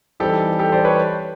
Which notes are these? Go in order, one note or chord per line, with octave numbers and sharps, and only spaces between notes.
E3 G3 C4 D#4 G4 A4
G4 A4
C5 D5
B4 C#5